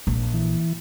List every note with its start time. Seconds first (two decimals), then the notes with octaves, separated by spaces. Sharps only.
0.07 A#1
0.34 E3